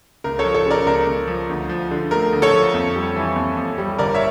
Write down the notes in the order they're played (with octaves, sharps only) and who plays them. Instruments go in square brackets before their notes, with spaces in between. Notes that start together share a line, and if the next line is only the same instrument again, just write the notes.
[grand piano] C#2 A#4
A4 C#5
F3
A4 C#5
C#3
A#4 D5
C#2 A#4
C#2
F3
D2
F3
D3
A3 A#4
D2
A4 C#5
F3
F2
G3
E3
F2
F2
G3
G1 A#4 D5
C#5 E5